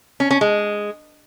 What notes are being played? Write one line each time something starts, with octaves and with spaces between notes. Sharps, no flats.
C#4
C#4
G#3